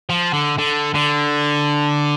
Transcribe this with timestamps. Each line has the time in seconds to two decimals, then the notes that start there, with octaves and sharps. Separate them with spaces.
0.09 F3
0.33 D3
0.58 D3
0.94 D3